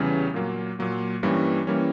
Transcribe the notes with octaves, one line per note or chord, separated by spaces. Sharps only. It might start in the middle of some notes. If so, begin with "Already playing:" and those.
Already playing: E2 C#3 E3 G3 C#4
A#2 F#3 A#3
A#2 F#3 A#3
G2 E3 G3 A#3 C#4
E3 G3 A#3 C#4